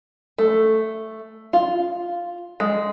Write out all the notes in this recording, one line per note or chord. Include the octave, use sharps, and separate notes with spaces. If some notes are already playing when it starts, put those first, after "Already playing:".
A3
F4
G#3